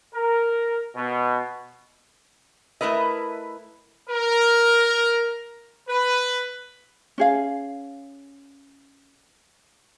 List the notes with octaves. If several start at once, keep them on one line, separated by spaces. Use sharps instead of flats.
A#4
B2
A3 E4 A#4 B4 D#5
A#4
B4
C#4 G#4 F5